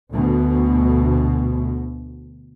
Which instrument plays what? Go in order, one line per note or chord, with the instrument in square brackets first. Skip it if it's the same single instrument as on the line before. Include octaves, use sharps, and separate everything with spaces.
[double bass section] D2 B2